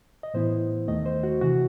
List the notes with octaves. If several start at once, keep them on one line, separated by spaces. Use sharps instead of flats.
D#5
A2 E3 B3 E4 C5
D#2 D#3 A3 D#5
C5
F#4
C3 E3 F#4